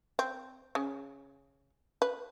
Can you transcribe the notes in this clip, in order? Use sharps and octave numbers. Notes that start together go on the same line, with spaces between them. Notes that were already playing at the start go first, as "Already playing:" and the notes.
C4
C#3
B4